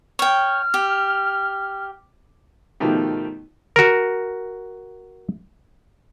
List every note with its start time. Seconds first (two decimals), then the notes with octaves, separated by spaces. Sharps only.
0.19 C#5 G5 F6
0.74 G4
2.80 B2 D#3 F3 A3 D#4 G4
3.76 F#4 A#4